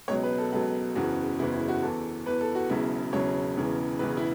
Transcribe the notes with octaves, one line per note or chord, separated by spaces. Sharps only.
C#2 B2 F#3 C#5
B4
A4
C#2 B2 F#3 A4
F#1 E2 C#3 E3 F#4
F#1 E2 C#3 E3 E4
E4
F#4
E2 E3 A4
E2 E3 B4
A4
F#4
E1 E2 C#3 F#3 E4
E1 E2 C#3 F#3 C#5
E1 E2 C#3 E3
E1 E2 C#3 E3 B4
E4